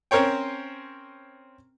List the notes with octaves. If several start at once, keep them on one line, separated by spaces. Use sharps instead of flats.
C4 C#4 A#4 C5 C#5 G5